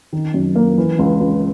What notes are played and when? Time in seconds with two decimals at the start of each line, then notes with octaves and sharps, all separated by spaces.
0.13 D#3
0.34 F#2
0.55 A#3
0.78 E3
0.99 C#2
1.20 C#2